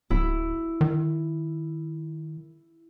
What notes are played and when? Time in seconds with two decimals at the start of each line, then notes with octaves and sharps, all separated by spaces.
0.10 D1 E4
0.81 D#3